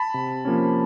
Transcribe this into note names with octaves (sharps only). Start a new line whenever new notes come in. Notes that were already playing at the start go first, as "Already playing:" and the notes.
Already playing: A5 B5
C3
F3 A#3 C#4